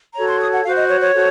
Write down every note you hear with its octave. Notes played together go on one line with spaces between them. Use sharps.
F#4 A4 C#5 A#5
C6
D#6
F#5
F#4 C5 F5
D#5
C#5
C#5
F#4 A4 C5